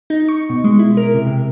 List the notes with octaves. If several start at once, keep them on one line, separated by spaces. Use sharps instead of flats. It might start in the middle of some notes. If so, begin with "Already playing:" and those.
D#4
C#6
B2
G#3
E4
A#4
C3
C3